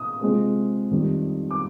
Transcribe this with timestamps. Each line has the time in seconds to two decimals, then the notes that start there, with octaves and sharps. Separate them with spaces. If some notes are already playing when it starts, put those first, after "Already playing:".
Already playing: D#6
0.21 C3 F3 G#3 C4
0.91 F2 D#3 G3
1.51 D6